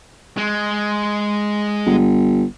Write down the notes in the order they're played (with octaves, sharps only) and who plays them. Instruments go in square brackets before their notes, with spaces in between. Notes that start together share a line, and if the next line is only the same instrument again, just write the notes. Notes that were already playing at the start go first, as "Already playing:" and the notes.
[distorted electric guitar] G#3
[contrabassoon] G1